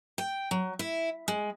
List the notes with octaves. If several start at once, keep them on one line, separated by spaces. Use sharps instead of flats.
G5
F#3
E4
G#3